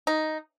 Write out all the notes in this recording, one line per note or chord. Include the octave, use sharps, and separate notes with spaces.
D#4